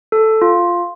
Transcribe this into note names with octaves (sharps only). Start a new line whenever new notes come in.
A4
F4